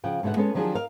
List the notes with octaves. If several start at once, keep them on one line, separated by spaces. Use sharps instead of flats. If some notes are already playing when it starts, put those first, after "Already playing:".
C#3 F3 F#5 G5
G#2 B2 D3 E5 F#5
G#3 B3 C#4 A4 B4
D#3 F3 F#3 D4 G4 G#4
A#4 D#5 F5